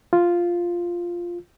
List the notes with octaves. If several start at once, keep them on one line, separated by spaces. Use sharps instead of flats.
F4